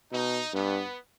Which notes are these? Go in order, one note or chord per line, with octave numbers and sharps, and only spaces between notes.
B2 D#4
G2 B3